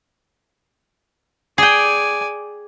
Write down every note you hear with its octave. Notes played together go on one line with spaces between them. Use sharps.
G#4 D5 G5 G#5